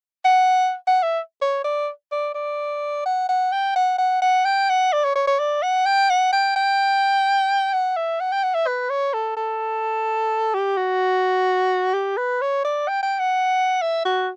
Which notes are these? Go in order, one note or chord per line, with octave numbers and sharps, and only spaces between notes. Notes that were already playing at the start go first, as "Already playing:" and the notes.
F#5
F#5
E5
C#5
D5
D5
D5
F#5
F#5
G5
F#5
F#5
F#5
G5
F#5
D5
C#5
C#5
C#5
D5
F#5
G5
F#5
G5
G5
F#5
E5
F#5
G5
F#5
E5
B4
C#5
A4
A4
G4
F#4
G4
B4
C#5
D5
G5
G5
F#5
E5
F#4